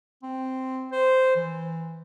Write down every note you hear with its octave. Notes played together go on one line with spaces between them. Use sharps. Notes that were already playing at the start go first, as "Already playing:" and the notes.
C4
C5
E3